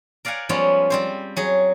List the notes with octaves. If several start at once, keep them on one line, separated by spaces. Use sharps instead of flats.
A#4 D5 F5 F#5 G#5
F3 G3 G#3 B3 C#4 F4
G3 C4 C5
F#3 G#4